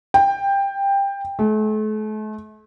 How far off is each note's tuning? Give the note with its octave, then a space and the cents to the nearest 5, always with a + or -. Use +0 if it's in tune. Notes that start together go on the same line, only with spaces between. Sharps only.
G5 +15
A3 -40